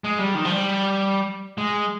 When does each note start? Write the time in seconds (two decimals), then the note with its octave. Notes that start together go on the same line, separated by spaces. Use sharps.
0.04 G#3
0.19 G3
0.35 D#3
0.45 F3
0.50 G3
1.58 G#3